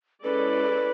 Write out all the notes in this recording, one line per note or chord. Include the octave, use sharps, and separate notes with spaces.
G#3 C#4 E4 A4 B4 D5